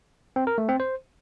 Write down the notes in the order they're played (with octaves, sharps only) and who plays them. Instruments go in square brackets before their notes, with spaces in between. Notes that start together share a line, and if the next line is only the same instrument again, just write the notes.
[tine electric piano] C4
A#4
A3
C4
C5